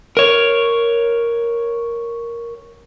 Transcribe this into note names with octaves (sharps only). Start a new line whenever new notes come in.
A#4 C#5